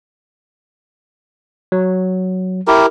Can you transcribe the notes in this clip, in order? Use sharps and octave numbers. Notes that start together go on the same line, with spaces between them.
F#3
E4 G4 A#4